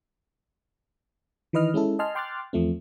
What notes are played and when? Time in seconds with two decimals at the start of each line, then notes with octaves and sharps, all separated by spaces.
1.53 D#3 E3 B4 D#5 F6
1.74 G#3 C#4 E4 A4
1.99 D#5 G#5 A5 C6 F6
2.15 G5 C6 D6 F6 F#6 A6
2.53 E2 F3 A3 C4